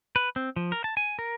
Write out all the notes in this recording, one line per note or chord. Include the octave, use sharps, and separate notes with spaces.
B4
C4
F3
A#4
A5
G#5
A#4